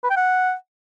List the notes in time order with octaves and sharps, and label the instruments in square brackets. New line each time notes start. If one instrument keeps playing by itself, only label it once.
[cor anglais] B4
G5
F#5